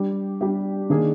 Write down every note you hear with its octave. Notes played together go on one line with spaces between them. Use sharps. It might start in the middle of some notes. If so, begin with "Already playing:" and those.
Already playing: G3 D4 G4
G3 D4 G4
D#3 A#3 D4 G#4